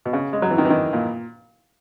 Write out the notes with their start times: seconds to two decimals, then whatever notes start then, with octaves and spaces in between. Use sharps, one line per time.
0.05 B2
0.13 C#3
0.33 G#3
0.42 F#3
0.51 E3
0.58 D#3
0.65 E3
0.70 D#3
0.93 A#2